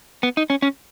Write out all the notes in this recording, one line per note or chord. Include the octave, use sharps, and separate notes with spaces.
B3
D#4
C#4
C#4